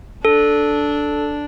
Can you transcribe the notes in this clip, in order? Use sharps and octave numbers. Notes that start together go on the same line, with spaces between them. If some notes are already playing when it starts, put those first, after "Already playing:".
D4 A4